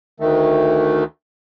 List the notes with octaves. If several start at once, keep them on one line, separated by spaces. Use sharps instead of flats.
D2 D#3 A3